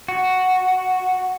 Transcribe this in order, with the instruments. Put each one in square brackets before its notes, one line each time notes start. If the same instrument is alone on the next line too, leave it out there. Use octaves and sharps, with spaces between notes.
[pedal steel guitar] F#4